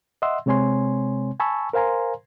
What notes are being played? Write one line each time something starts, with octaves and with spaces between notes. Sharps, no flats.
D#5 E5 F#5 C6 E6
C3 G#3 C4 C#5 G#5 C6
G#5 A5 B5 C#6 E6
A#4 C5 F5 G#5 A#5 C6